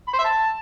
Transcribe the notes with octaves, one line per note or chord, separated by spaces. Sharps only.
B5
C5
E5
A5